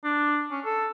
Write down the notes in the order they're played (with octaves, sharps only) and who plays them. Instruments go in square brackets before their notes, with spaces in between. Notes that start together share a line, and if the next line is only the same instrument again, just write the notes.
[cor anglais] D4
C#4
A4